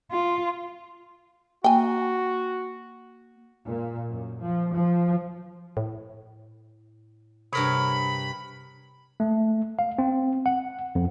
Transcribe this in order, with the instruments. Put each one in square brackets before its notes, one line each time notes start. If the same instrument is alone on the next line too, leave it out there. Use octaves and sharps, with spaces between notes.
[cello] F4
[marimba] A#3 [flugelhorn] F#4 [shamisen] G5 G#5
[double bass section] A#2
F#2
F3
F3
[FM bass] A2
[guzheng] G2 A#4 C#5 [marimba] C3 [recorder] B5
[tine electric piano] A3
F5
C4
F#5
F2